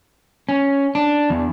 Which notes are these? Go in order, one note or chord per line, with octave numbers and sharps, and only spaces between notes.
C#4
D4
E2